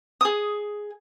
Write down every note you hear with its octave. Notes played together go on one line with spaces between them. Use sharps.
G#4 D#6